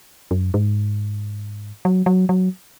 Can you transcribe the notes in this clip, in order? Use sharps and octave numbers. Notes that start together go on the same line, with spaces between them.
F#2
G#2
F#3
F#3
F#3